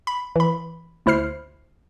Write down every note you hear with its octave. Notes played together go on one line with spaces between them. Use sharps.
B5
E3 B5
D2 E4 C5 F6 C7